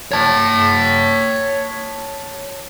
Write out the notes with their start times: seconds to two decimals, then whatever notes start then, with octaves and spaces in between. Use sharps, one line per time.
0.12 C#5 A5